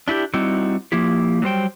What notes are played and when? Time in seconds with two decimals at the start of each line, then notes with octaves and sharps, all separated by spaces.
0.08 D4 E4 F4 G4
0.34 G3 C4 D#4 E4 F#4
0.92 F3 A#3 E4 G4
1.42 F#3 G3 C5 G5